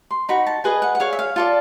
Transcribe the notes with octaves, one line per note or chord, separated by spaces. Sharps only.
C6
D#4 F#4 B5
A5
G#4 B4 D#5 G#5
F#5
F#5
G#4 C#5 F5
E5
F5
F4 A4 D5